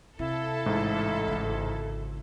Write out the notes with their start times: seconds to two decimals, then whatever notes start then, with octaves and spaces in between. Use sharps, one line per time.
0.19 C3 E4 A4 F5
0.66 A1 G#2
1.28 G#1 C#3